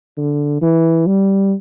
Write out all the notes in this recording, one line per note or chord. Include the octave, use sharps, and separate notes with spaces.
D3
E3
G3